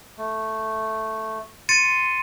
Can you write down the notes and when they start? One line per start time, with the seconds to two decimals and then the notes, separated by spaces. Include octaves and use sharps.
0.18 A3
1.69 C6 A6 C#7 D#7